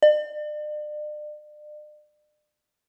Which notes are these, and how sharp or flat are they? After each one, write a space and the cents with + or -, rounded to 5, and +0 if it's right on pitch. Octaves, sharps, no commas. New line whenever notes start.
D5 +40